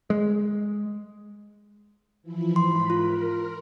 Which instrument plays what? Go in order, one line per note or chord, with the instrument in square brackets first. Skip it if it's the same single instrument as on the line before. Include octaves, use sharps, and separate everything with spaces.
[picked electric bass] G#3
[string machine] E3 F3 E4
[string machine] G#2 B5 [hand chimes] C6
[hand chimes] F4 [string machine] A#4